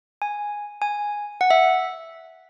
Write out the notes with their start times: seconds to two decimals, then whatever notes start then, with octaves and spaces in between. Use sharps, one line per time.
0.22 G#5
0.82 G#5
1.41 F#5
1.50 E5